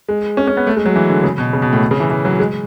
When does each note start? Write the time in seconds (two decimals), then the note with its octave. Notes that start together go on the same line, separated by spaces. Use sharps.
0.09 G#3
0.37 C#4
0.48 C#4
0.57 B3
0.67 A3
0.76 G#3
0.86 F#3
0.96 E3
1.09 D3
1.24 C#3
1.38 B2
1.53 C#3
1.62 B2
1.73 A2
1.91 C#3
2.00 E3
2.10 E3
2.25 F#3
2.40 G#3